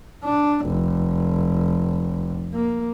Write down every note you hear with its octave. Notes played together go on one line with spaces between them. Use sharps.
D4
F1
A#3